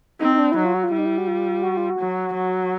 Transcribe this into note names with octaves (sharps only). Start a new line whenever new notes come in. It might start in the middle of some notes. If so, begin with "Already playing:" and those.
C4 D#4
D#4
D4
E4
F#3 D#4
F4
F#4
F4
G3 E4
D#4
E4
F#4
F4
F#4
F4
F#4
F#3
F#3